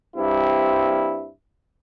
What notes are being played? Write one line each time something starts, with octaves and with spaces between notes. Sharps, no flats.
G2 G3 C4 E4